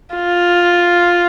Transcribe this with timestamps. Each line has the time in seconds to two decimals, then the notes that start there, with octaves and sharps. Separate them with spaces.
0.15 F4